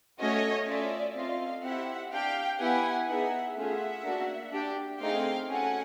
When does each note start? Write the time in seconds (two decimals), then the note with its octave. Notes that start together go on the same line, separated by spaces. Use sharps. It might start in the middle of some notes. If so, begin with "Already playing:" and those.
0.19 A3 C#4 F#4 C#5 D#5
0.66 C#4 F4 A4 D5 E5
1.15 C4 F4 A4 D#5 F5
1.63 C4 E4 G4 E5 F#5
2.11 D4 G4 F5 G5
2.60 B3 E4 G4 F#5 G#5
3.08 B3 D#4 G#4 E5 F#5
3.56 A3 C#4 F4 G#4 E5 F#5
4.04 A#3 D4 F#4
4.53 D4 G4
5.00 A3 C4 D#4 G#4 F5 G5
5.49 C#4 F#4 A4 F#5 G#5